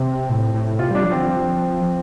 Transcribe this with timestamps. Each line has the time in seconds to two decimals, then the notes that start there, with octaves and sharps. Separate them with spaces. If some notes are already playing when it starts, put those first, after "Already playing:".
Already playing: C3 C4
0.30 A2
0.54 A2
0.79 C3 F4
0.91 G3 D4
1.04 F3
1.11 D3 C4
1.29 F3